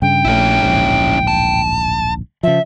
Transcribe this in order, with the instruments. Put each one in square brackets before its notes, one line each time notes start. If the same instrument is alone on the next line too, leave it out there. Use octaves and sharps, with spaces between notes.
[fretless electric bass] G2 C#3 [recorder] G5
[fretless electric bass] A#1 E3 A3 [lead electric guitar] C#4 E4
[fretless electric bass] D1 A#1 G#2
[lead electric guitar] A5
[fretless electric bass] C#3 F3 [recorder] E5